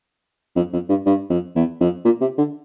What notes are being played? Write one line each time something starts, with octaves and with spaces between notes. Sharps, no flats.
F2
F2
G2
G2
F2
E2
F2
A#2
C3
D3